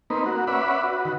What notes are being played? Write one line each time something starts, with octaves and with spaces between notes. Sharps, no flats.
A#3 C4 D#4 B4
A#3 F#4
C#4 B4 D5 E5 F#5 B5
F#4 B4
D#3 F#4